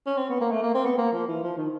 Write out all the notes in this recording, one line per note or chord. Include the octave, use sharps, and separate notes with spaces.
C#4
C4
B3
A#3
A3
A#3
C4
B3
A#3
F3
E3
F3
D#3